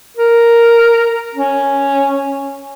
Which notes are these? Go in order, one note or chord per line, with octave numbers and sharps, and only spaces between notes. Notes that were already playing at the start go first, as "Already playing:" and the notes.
A#4
C#4